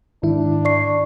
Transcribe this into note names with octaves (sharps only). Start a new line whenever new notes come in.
G#2 D#3 D4 E4
D5 C#6 C7